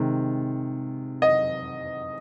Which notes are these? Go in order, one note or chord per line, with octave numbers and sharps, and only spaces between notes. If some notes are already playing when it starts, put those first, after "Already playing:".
Already playing: C3 D#3 G#3
D#5